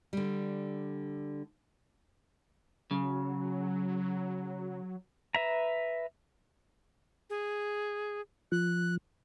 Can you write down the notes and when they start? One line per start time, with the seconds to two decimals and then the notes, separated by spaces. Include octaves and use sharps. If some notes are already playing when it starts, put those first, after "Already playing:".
0.13 D3 G3
2.91 C#3 F#3
5.35 B4 E5 A#5
7.30 G#4
8.52 F3 F#6